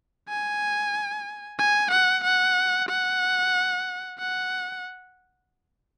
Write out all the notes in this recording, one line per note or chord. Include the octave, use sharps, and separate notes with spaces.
G#5
G#5
F#5
F#5
F#5
F#5